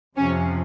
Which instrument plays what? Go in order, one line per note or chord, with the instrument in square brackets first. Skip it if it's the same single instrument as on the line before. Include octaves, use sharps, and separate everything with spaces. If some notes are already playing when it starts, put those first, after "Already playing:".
[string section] F2 C3 F3 C#4